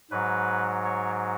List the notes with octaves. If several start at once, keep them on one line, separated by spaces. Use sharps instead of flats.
G#2 F#3 B4
C#5